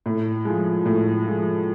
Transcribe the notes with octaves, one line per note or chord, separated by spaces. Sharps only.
A2
F3 G#3
A2
F3 G#3